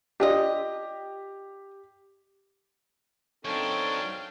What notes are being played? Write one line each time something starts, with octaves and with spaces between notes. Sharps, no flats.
D4 F4 G4 D#5
F#2 C4 D4 D#4 A4 C#5 F5 G5